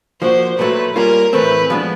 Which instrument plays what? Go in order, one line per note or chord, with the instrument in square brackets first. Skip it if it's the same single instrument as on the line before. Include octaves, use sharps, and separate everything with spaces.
[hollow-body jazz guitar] F3 A#3 D4 F#4 [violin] C5
[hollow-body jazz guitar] A#2 F#3 A3 [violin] B4
[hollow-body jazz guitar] G3 A#3 C#4 F4 [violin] A#4
[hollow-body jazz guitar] A2 E3 A3 C4 [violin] B4
[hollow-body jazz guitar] F3 G#3 B3 D4